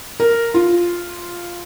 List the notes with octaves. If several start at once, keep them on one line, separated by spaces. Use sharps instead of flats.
A#4
F4